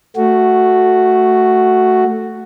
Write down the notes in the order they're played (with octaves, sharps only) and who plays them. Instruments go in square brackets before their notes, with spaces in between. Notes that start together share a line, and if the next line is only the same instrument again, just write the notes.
[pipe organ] A3 F#4